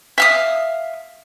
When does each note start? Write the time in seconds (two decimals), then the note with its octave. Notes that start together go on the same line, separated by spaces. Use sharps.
0.18 E5 F5 D#6